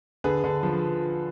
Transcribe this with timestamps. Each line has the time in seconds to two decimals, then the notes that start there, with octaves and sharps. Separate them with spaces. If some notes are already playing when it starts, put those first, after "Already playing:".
0.24 D3 G#4 B4
0.44 D3
0.63 F3